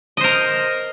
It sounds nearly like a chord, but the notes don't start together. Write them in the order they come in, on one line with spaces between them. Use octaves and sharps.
D#5 C5 A#4